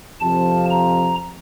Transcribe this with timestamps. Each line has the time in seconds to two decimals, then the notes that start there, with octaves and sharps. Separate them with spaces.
0.20 F2 C3 F3 A5
0.70 A#5